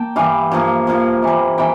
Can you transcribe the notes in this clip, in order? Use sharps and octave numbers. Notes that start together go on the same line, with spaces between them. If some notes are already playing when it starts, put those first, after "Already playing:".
Already playing: A#3 G5 A5
G2 E3 G3 F5
G2 F3 A#3
G2 F3 A#3
C3 E3 G3
C3 E3 G3 G5